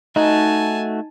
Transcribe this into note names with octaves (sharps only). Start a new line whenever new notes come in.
A3 D#4 F#4 G#5 A5